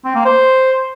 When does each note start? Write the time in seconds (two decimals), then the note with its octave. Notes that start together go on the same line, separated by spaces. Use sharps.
0.05 C4
0.15 A#3
0.25 C5